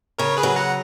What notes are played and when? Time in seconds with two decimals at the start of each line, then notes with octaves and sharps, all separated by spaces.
0.18 C#3 A#4 C#5
0.37 G#4 B4
0.43 F#3
0.56 F#5 A#5